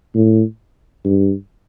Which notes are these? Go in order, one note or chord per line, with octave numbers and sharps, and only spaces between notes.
A2
G2